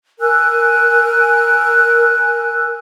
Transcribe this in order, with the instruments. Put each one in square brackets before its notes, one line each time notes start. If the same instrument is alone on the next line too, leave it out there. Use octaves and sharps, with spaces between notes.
[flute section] A#4 G#5 E6 F#6